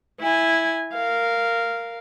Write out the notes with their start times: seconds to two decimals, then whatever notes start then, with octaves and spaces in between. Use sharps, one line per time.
0.20 E4 G#5
0.94 A#4 F5